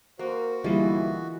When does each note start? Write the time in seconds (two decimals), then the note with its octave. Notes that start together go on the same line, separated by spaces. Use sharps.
0.19 A#3 F#4 A#4 C5
0.64 B1 D3 E3 G3 G#3 A#3 E4 F4